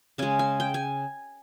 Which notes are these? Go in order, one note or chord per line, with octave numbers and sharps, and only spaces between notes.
C#3 G#3 G#5
G#5
G5
G#5